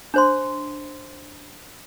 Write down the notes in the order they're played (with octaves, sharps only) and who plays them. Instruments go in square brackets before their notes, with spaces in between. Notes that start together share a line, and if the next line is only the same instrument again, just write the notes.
[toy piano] D4 C5 C6